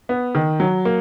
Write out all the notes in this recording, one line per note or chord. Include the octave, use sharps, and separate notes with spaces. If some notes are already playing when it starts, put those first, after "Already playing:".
B3
D#3
F#3
A#3